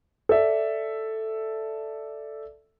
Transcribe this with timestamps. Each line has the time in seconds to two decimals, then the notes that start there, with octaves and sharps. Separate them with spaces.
0.29 A4 D5 E5